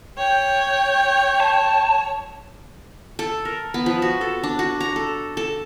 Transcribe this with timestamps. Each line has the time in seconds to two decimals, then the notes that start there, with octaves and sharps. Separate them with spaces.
0.18 C#5 G5
1.40 A5
3.19 A4
3.45 A#4
3.74 B3
3.86 F3
4.02 F#4
4.21 A4
4.43 D4
4.59 F#4
4.81 A#5
4.96 A4
5.37 A4